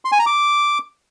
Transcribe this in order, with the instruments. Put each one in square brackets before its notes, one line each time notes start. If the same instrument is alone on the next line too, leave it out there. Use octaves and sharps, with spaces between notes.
[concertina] C6
G#5
A#5
D6